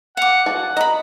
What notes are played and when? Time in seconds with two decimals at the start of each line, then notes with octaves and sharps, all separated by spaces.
0.17 F5 F#5 D6
0.46 E3 F#4 F#5 A5
0.77 D#5 A#5 B5